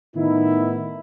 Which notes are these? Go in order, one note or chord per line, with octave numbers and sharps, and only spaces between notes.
A2 D#3 B3 D#4 E4